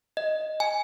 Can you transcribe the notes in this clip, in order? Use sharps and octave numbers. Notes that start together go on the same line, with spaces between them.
D#5
G#5